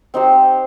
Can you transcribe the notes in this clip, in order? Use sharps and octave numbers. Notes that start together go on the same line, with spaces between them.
C4 D#4 G4 C5